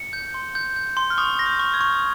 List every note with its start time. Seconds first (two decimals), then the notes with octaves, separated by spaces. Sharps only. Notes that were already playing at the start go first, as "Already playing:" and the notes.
Already playing: C#7
0.13 G6
0.34 C6
0.55 G6
0.76 G6
0.97 C6
1.10 F6
1.18 C#6 D#6
1.39 A#6
1.46 G6
1.59 C#6
1.74 G#6
1.81 C#6